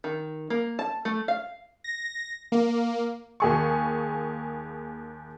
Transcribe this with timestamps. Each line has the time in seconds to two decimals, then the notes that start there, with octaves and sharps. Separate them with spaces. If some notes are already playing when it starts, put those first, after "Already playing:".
0.04 D#3
0.50 A#3
0.79 A5
1.05 A3
1.28 F5
1.84 A#6
2.52 A#3
3.40 D#2 G#4 C#6